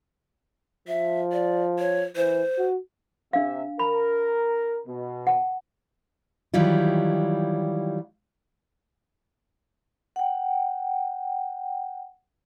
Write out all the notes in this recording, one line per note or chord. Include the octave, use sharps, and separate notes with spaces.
F3 E5
D5
C#5
E3 C5
F#4
C3 D4 E5 F5
A#4 B5
B2
F#5 A5
D#3 E3 F#3 G3 E4 F4
F#5 G5